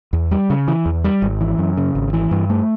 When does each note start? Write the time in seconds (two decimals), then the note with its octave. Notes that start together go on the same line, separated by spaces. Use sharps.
0.13 E2
0.31 G3
0.50 C#3
0.68 E3
0.86 E2
1.04 G3
1.22 G#1
1.41 E3
1.58 F#2
1.77 C#3
1.95 G#1
2.13 E3
2.31 G2
2.50 A3